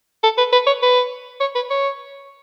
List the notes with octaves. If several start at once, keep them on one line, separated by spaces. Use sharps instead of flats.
A4
B4
B4
C#5
B4
C#5
B4
C#5